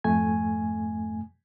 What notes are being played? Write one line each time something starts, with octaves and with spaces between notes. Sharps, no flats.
F2 G#2 A3 G#5 G#6